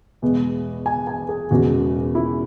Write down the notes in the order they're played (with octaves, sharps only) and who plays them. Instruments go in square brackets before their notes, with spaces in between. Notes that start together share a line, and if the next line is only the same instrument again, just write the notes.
[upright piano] E2 B2 G#3
G#5
G#5
G#4
E1 E2 C#3 G#3 F#4
E4